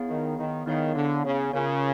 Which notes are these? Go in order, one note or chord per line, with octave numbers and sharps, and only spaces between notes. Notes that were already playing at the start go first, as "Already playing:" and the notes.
Already playing: B3 E4 G#4 C#5 F5
D#3
D#3
D#3 B3 E4 G#4 C#5 F5
D3
C#3
C#3 F4 A#4 C#5